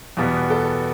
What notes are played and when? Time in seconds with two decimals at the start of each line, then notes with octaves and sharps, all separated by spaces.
0.17 E2 B2 G3 B3
0.50 A4